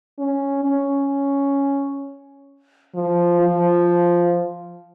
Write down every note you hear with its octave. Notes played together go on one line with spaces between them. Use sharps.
C#4
C#4
F3
F3